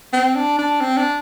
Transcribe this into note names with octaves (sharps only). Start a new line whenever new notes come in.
C4
D4
D4
C4
D4